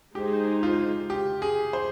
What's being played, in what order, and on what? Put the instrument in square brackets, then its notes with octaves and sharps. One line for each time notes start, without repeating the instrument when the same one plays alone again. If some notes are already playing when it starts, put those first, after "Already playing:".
[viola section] G#3 D#4 G#4 C5 [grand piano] G4
[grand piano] F4
G4
G#4
C5